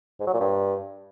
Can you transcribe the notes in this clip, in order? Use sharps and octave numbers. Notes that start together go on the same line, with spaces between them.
G#2
F#3
A#2
G2